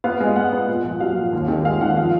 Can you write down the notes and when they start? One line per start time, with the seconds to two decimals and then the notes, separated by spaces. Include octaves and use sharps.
0.04 B3 F5
0.20 G#3
0.36 G#3 F#5
0.53 B3
0.68 A#2
0.84 A#1
1.00 F#3 F5
1.16 A#2
1.33 D#2
1.48 D#3
1.65 G#3 F5
1.81 D#3 F#5
1.97 F3 F5